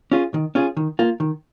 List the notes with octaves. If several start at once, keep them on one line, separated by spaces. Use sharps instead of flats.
C#4 F4 G#4
D#3
C#4 F4 G#4
D#3
A#3 F4
D#3